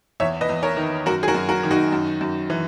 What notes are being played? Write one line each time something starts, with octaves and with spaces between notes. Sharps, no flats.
E2 C#5 E5
B4 D#5
E2
A#4 C#5
D#3
F#2 F#4 A#4
G#4
F#4 A#4
F#2
F#4 A#4
D#3
D#4 F#4
F#2
F#2
E3